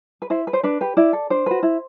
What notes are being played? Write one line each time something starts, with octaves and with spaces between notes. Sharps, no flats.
B4
E4 C5
B4
C5
D4 B4
G4 B4
E4 D5
A4
D4 C5
F#4 B4
E4